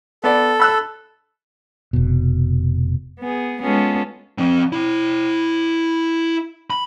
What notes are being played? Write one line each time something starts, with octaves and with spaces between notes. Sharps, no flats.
B3 A4 D5
B5 E6 F#6
F1 B2
B3 G#4
G#3 B3 C#4 F4 G#4 A4
F3 C4
E4 G5
B5